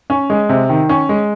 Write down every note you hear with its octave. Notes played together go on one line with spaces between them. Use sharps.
C#4
G#3
C3
D#3
C#4
G#3